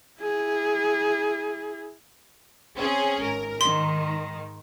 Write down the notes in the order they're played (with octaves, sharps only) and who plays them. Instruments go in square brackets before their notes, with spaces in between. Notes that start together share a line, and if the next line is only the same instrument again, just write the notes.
[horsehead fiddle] E4 G#4
[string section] C4 C#4 G#4
G#1 A#4
[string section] G#2 D#3 [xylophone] C6